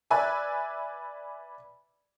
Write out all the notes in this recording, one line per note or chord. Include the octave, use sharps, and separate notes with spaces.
B4 D5 E5 G#5